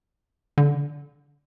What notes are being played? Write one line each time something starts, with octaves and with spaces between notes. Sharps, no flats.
D3